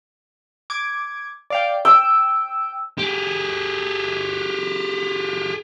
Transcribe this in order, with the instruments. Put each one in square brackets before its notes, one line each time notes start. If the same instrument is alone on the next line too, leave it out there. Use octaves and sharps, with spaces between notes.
[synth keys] D6 G#6
D5 F5 G5
[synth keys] G5 [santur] E6
[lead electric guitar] G4 G#4